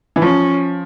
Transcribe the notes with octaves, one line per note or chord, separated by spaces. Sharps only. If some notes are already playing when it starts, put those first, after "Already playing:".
E3
F3 C#4